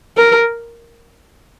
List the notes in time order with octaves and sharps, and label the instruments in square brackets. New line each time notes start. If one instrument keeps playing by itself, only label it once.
[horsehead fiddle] A#4